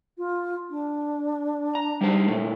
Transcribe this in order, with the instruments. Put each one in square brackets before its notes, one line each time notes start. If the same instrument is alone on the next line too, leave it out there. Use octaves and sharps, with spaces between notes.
[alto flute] F4
D4
[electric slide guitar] A#5
G3 D#4 C5
A#2 A3